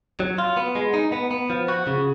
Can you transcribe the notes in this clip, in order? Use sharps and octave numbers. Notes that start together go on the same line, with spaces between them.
F#3
F4
B3
G#3
D#4
B3
B3
F3
F#4
C#3